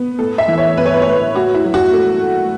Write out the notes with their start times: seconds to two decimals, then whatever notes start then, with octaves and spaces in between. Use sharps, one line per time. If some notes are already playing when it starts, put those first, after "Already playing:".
Already playing: B3
0.19 A2 A4
0.38 E5
0.48 E3
0.58 C#5
0.77 B3 B4
0.86 C#5
0.94 B4
1.02 C#5
1.06 A2 B4
1.35 A2 F#4
1.54 E4
1.65 F#3
1.74 F#4
1.93 A3